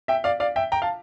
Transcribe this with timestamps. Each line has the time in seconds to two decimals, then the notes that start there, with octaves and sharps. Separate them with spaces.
0.08 E5 G5
0.24 D5 F5
0.40 D5 F5
0.56 E5 G5
0.72 G5 A#5
0.82 F5 A5